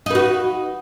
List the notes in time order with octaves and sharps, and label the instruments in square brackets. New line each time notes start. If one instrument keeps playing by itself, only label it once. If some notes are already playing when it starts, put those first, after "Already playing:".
[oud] D#4
B4
F#4